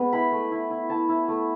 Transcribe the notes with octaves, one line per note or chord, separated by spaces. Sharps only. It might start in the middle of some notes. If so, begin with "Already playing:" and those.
Already playing: G#3 B3
E4 B5
A3
E4
E4
E4 A5
E4
A3